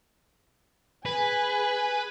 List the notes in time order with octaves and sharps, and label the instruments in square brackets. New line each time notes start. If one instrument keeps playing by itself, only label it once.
[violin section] G#4 G#5 [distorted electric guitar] B4